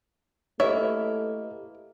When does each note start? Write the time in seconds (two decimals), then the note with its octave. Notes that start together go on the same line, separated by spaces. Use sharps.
0.60 A3 A#3 E4 G4 B4 C#5 D#5 E5